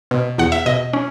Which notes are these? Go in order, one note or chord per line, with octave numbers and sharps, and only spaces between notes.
B2
E2 F#5
E5
B2 D#5
C#4